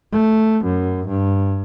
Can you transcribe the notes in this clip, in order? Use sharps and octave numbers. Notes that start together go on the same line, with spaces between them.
A3
F#2
G2